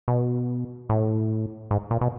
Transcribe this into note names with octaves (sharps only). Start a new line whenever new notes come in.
B2
A2
G#2
A#2
B2